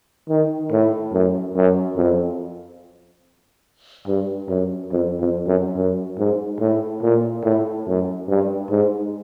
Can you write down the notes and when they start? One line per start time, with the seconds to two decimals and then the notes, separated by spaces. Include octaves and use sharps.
0.29 D#3
0.72 A2
1.13 F#2
1.55 F#2
1.97 F2
4.07 G2
4.49 F#2
4.92 F2
5.20 F2
5.48 F#2
5.76 F#2
6.19 G#2
6.60 A2
7.02 A#2
7.44 A2
7.87 F#2
8.28 G2
8.70 G#2